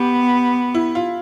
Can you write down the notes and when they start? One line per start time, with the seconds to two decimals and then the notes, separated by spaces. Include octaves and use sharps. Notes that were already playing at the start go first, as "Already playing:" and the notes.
Already playing: B3 G4
0.74 E4
0.95 F4